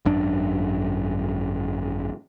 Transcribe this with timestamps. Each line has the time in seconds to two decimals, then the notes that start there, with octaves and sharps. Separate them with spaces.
0.05 G#1 F#2 D4